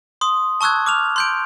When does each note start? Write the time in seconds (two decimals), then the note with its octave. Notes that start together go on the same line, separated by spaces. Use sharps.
0.21 C6 D#6
0.61 A5 C#6 E6 F#6 G#6
0.86 D6 F6 F7
1.16 C6 G6 D7